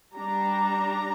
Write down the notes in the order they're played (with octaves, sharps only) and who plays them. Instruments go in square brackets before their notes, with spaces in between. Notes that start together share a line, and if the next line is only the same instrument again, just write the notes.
[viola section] G3 D4 A#5